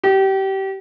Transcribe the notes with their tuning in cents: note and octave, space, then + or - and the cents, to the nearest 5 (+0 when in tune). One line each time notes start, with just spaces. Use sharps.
G4 -25